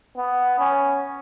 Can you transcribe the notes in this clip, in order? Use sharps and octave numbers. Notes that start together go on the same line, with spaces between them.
B3
C#4